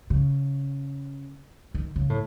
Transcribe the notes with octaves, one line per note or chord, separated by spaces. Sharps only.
C#3
D#3
C#3
A2